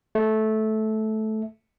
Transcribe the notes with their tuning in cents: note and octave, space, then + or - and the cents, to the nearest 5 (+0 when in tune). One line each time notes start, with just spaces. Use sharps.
A3 -15